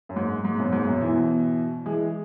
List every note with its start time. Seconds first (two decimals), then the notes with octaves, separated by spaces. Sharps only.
0.09 F#2
0.16 G#2
0.45 G#2
0.58 F#2 B2
0.72 G#2
0.87 F#2 B2
1.01 B2 E3
1.86 E3 G#3